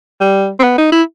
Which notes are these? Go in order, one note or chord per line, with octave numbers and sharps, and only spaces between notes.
G3
C4
B3
D#4
E4